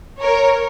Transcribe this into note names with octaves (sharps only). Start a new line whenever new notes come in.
A#4 C#5